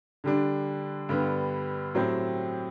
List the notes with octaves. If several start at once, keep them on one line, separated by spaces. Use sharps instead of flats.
D3 G3 D4
G2 D3 G3 B3
A2 F#3 C4 G4